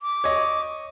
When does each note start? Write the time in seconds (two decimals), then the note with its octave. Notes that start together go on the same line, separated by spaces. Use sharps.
0.01 D6
0.24 C#5 D#5